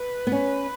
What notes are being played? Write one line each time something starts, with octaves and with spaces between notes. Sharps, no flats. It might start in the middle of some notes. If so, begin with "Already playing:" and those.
Already playing: B4
B3
C#4